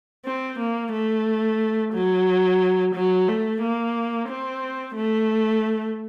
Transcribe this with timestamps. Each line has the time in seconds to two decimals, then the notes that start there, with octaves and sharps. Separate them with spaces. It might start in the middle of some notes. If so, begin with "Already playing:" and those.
0.25 C4
0.59 A#3
0.93 A3
1.93 F#3
2.95 F#3
3.28 A3
3.62 A#3
4.29 C4
4.96 A3